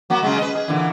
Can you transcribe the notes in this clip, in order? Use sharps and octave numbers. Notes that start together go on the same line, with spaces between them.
F#3 A#3 F#4
C#3 F#3 G#3
B4 D#5
G#4
A#2 D3 E3